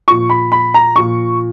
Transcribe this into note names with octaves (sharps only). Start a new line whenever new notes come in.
A#2 F3 C#6
B5
B5
A#5
A#2 F3 C#6